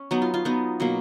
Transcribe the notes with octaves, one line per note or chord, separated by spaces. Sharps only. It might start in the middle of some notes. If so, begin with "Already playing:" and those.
Already playing: C#4
F#3 B3 D#4
F4
F4
F#3 B3 D#4
B2 F#3 A#3